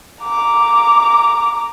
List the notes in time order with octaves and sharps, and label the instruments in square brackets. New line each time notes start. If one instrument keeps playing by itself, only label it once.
[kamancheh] A#5 D6